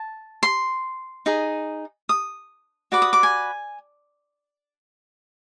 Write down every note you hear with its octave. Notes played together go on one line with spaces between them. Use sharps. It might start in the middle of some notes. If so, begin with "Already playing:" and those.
Already playing: A5
C6
D#4 G#4
D#6
F#4 B4 D5 D6
D#6
D6
G#5